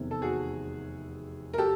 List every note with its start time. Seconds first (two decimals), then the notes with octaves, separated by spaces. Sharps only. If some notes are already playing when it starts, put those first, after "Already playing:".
Already playing: F1 E2 C3 D#3
0.11 A4
0.22 F#4 G#4
1.54 A#4
1.58 G4 A4